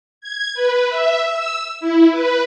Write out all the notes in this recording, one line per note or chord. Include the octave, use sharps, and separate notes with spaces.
G#6
B4
E5
E6
E4
B4